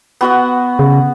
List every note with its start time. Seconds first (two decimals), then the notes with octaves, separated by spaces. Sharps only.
0.21 B3 F#4 F#5
0.79 C#3